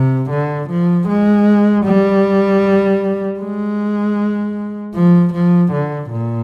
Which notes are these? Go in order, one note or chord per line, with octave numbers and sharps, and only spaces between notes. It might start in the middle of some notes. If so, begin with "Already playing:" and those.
Already playing: C3
D3
F3
G#3
G3
G#3
F3
F3
D3
A#2